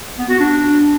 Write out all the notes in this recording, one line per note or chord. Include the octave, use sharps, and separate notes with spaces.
B3
F#4
D4